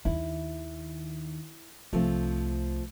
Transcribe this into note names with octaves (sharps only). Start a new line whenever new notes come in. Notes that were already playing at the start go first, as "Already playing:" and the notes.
D#2 D#3 E4
C2 F3 A3 C4